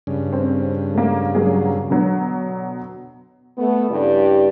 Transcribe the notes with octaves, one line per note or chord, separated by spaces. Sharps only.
G2 C#3
C4
A3 A#3
F#3 A#3 G#4
B2 D3 F#3
A3 B3
G2 C#3 E4 G4 D5